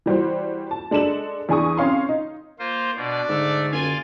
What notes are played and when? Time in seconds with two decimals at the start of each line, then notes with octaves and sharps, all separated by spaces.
0.06 E3 G3 F#4 C5
0.71 A5
0.91 G#3 D4 A4 E7 F#7
1.49 E2 D4 G#4 G#5 C#6 D#6
1.77 C4 C#4 C#5 F5 C6
2.09 D#4
2.59 A#3 F4 C5
2.97 B2 D4 D5
3.29 G#2 D3 A3 A6
3.72 F#1 F4 D5 F5 G#5